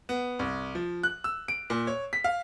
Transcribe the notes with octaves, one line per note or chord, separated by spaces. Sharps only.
B3
C2
F3
F#6
E6
D7
A#2
C#5
B6
F5